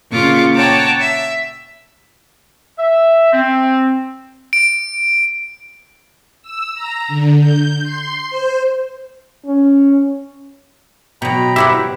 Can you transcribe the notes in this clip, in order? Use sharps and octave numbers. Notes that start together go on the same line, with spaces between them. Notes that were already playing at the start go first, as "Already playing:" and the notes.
A#2 C#3 F4 C#6 D6
C#5 F#5 G5 A5 A#5 D6
E5
E5
C4
D7
E6
A#5
D3
G6
C6
C5
C#4
B2 F#3 G5 A#5 B5
E4 G4 C5 E5 F#5